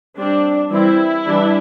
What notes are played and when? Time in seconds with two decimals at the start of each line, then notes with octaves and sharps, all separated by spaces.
0.16 G3 C4 D4
0.70 E3 G3 C4 E4
1.25 E3 G3 D4